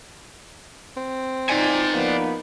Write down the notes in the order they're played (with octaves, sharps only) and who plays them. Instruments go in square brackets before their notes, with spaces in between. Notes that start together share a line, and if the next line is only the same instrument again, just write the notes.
[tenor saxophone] C4
[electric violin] D#4 [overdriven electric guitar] D5 G#5
[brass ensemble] F3 A#3 B3